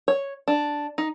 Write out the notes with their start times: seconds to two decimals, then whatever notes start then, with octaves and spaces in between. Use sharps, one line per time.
0.08 C#5
0.48 D4
0.98 D#4